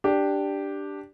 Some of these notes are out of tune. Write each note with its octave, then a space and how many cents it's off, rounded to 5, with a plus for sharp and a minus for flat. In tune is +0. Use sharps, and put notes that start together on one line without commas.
D4 +0 G4 +0